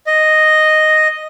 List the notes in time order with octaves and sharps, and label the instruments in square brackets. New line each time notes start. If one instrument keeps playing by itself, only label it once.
[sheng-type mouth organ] D#5